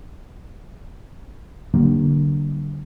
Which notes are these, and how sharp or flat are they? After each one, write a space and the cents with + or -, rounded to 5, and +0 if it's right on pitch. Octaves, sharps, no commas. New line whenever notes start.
D3 +0 G3 -40 A#3 +0